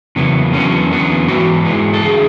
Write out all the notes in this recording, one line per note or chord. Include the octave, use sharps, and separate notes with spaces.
E2 C#3 F#3 B3
E2 D3 F#3 B3 C#4
E2 D3 F#3 B3
G#2 E3 B3 F#4
G#2 E3 G#3 B3
A4
E2 D3 A3 G#4